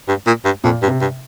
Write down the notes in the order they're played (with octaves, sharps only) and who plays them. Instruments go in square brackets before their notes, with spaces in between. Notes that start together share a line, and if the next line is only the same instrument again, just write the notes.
[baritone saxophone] G2
A#2
G2
[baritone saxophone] F2 [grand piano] A#2
[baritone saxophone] G2
[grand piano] C3
[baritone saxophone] G2